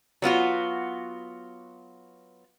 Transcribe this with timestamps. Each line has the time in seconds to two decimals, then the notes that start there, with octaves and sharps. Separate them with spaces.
0.22 F#3 B3 F4 F#4